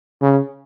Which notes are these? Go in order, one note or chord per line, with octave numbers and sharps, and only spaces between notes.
C#3